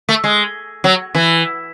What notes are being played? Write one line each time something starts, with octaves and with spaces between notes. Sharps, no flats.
A3
G#3
F#3
E3